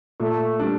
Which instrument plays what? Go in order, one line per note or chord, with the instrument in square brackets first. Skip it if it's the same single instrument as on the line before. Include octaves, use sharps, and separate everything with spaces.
[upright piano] A#2 [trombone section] A3
[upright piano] G3 D4